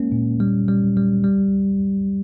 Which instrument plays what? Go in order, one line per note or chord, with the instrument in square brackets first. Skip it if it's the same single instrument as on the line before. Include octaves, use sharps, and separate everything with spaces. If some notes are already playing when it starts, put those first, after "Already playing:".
Already playing: [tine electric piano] G#3 A#3 C#4
A#2
G3
G3
G3
G3